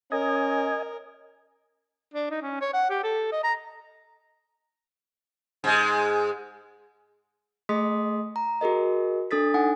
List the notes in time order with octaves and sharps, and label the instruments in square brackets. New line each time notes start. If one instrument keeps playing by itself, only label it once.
[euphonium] C#4 [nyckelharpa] A#4 [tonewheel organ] D#5 G#5
[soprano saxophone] D4
D#4
C#4
C#5
F#5
G4
A4
D#5
A#5
[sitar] G#2 G#3
[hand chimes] A3 G#4 D#5 C6 D#6 B6
A#5
F#4 G#4 A#4 D#5
D4 A4 D#6 A6 B6
D#4 F#5 G#5